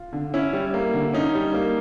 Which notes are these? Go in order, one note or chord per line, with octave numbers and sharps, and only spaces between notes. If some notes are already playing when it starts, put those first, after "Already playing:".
Already playing: F4
D3
C#4 E4
G3
A#3
D3
C#4 D#4
G3
A#3